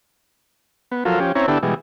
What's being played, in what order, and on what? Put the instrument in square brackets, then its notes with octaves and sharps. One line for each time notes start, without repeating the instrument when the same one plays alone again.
[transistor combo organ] B3
F3 F#3 F4 A4 A#4
F3 C#4 G4
C4 C#4 E4 C#5 A#5
D3 B3 D4 E4 G4 A4
B2 E3 G3 G#3